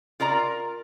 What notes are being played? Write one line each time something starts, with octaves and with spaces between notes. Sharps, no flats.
F4 A#4 D5 A#5